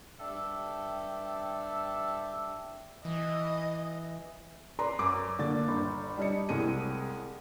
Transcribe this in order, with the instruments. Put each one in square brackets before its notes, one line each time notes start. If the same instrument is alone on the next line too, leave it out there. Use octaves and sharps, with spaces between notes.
[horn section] G2 D4 A4 E5 G5
[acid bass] E3 [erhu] D#5
[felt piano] B4 D5 A#5 C6
F#2 D6
A#2 D3 A6
G1
G3 D4 D#5 C#7
C2 A2 G#3 C4 G#4 D#7